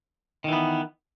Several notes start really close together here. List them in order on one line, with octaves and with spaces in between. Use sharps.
D#3 E3 B3